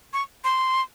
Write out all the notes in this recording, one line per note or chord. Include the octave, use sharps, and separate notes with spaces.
C#6
C6